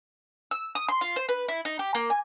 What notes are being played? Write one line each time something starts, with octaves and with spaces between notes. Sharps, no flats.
E6
D#6
C6
F4
C5
B4
E4
D#4
G4
A#3
G#5